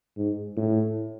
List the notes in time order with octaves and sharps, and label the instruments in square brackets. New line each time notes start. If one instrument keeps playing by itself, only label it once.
[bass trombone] G#2
A2